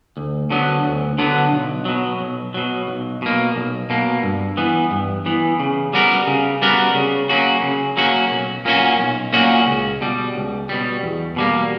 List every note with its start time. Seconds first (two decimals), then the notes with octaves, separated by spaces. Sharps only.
0.17 D2
0.50 D3 F#3 B3
0.84 D2
1.18 D3 F#3 B3
1.52 B1
1.85 B2 F#3
2.20 B1
2.54 B2 F#3
2.88 B1
3.22 B2 A#3
3.56 B1
3.90 B2 A#3
4.23 G2
4.57 E3 B3
4.91 G2
5.26 E3 B3
5.60 C#3
5.93 G3 B3 F#4 A#4
6.27 C#3
6.62 G3 B3 F#4 A#4
6.95 C#3
7.29 F#3 A#3 C#4 F#4
7.63 C#3
7.97 F#3 A#3 C#4 F#4
8.31 B1
8.65 A#2 A#3 C#4 F#4
8.99 B1
9.33 A#2 A#3 C#4 F#4
9.67 C#2
10.01 B2 G3
10.35 C#2
10.69 B2 G3
11.03 E2
11.36 B2 G3 A#3